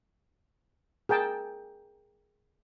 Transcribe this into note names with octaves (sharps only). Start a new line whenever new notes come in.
G#4 A#4 G5 A5